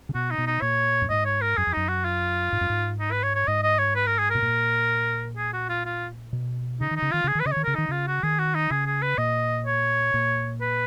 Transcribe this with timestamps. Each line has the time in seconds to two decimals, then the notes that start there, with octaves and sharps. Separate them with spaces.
0.09 C#3
0.15 B2 F#4
0.31 D#4
0.38 B2
0.47 D#4
0.62 A#2 C#5
1.02 F#2
1.10 G#2 D#5
1.25 C#5
1.42 A#4
1.57 F#2 G#4
1.67 F2
1.73 F#2 D#4
1.89 F#4
2.05 F4
2.52 G#2
2.61 F#2
2.70 G#2
3.00 D#4
3.12 B4
3.23 C#5
3.36 C#5
3.48 G#2 D#5
3.63 D#5
3.79 C#5
3.96 B4
4.07 A#4
4.19 G#4
4.31 B2 A#4
4.42 A#2
5.37 G#4
5.53 F#4
5.69 F4
5.85 F4
6.33 B2
6.81 C#3 D#4
6.91 D#3
6.96 D#4
7.02 C#3
7.12 D#3 F4
7.24 C#3 G#4
7.35 D#3 B4
7.45 C#3 D#5
7.52 D#3 C#5
7.64 C#3 A#4
7.75 D#3 D#4
7.89 C#3 F4
8.08 F#4
8.23 D#3 G#4
8.39 F#4
8.55 D#4
8.71 C#3 G#4
8.87 G#4
9.02 B4
9.18 A#2 D#5
9.66 C#5
10.14 A#2
10.61 B4